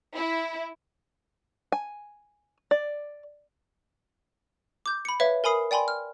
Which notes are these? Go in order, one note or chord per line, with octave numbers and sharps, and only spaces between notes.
E4
G#5
D5
D6 G6
B5 C#7
B4 C#5 E5 F5
A#4 G#5 B5 D#6 C7
D5 G5 G#5 B5 C6
F6